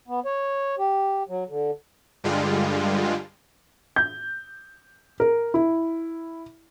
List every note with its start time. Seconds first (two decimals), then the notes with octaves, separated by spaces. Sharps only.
0.08 B3
0.25 C#5
0.78 G4
1.29 F#3
1.49 D3
2.24 G2 D3 G3 G#3 F4
3.96 G6
5.20 A#4
5.54 E4